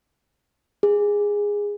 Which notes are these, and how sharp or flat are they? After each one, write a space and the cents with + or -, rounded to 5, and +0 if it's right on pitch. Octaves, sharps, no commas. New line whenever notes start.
G#4 -10